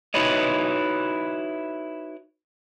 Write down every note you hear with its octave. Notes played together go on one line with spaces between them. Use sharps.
D#4 E4 F#4 B4 C#5 D#5